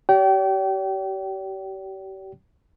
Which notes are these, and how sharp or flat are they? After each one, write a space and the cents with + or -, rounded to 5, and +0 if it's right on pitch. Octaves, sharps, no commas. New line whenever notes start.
G4 -35 D5 -45 G5 -30